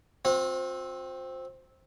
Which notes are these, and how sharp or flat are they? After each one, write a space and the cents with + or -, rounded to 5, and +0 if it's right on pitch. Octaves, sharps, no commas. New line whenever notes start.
C4 +0 F4 +45